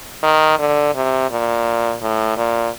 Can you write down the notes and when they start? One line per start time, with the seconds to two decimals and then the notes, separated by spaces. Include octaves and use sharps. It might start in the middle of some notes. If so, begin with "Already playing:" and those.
0.23 D#3
0.59 D3
0.95 C3
1.31 A#2
2.02 A2
2.37 A#2